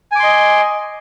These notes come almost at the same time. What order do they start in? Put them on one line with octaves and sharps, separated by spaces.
G#5 D6 C6 D#5